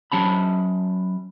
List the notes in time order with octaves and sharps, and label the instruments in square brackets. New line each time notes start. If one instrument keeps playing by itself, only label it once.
[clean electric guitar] F#3 C#4 A5 B5